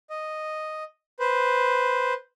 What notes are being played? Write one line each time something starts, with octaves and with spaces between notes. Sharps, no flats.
D#5
B4 C5